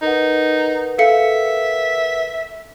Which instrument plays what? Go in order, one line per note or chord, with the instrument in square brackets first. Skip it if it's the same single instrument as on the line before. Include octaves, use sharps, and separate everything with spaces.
[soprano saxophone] D#4 [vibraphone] A#4 B4 F#5
[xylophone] A4 F5 C#7 [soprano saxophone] E5